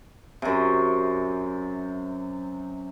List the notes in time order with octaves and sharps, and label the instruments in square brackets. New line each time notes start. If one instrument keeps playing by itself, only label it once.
[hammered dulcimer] F#2 C3